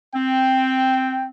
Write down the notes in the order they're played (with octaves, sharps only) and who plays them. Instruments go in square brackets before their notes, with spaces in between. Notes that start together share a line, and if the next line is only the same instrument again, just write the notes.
[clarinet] C4 [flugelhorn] G5